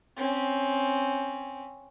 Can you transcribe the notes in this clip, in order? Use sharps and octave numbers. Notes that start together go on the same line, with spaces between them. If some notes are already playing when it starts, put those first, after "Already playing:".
C4 C#4